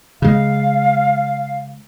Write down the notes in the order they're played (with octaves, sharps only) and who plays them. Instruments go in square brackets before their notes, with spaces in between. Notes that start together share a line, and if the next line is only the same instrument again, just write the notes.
[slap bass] C#3 G#3 [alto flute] F5